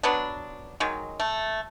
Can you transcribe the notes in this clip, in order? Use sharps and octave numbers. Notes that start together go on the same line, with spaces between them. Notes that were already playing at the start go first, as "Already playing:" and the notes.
F#3 B3 D4
D#3 F#3 G#3
A3